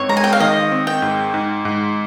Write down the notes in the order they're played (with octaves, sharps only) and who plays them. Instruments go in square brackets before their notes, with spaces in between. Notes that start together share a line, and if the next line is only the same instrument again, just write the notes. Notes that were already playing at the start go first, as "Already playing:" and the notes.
Already playing: [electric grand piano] G#2 C4 [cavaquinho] C#5
[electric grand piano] G#3 [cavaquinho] A#5
[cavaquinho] G#5
G5
F5
[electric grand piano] D#3 [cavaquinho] D#5
[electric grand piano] C4
[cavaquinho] G5
[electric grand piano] G#2
G#2
G#2